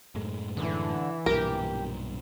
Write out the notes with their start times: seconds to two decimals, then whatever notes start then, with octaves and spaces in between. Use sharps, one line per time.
0.15 F#2 A2 G#3
0.57 D3 E3
1.26 B1 G2 A#2 G4 A#4